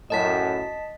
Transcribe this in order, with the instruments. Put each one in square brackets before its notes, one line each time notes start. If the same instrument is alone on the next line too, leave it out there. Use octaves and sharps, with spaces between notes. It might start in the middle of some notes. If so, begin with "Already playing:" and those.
[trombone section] F#2 A2 [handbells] D#5 A5 B6